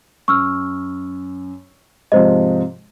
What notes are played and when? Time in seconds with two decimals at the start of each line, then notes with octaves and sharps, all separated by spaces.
0.28 F#2 C#6 E6 F6
2.12 G#2 C3 F3 C5 D#5